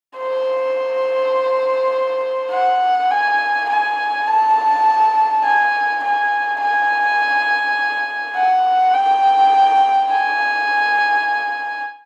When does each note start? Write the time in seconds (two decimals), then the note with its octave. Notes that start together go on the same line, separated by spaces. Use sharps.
0.18 C5
2.51 F#5
3.11 G#5
3.69 G#5
4.27 A5
5.44 G#5
6.03 G#5
6.61 G#5
8.35 F#5
8.95 G5
10.11 G#5